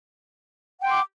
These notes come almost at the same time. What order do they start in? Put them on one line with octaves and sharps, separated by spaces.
F#5 G5 C6 D6